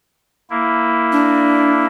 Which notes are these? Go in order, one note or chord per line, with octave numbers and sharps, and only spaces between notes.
A#3 E4
D4